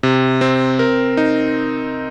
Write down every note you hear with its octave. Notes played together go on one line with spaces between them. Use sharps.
C3
C4
A#4
D#4